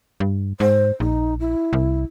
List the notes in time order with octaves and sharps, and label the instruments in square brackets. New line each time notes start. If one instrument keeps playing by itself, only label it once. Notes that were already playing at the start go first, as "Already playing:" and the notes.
[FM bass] G2
[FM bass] G#2 [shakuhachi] C5
[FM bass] A#1 [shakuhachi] D#4
[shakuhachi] E4
[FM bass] C2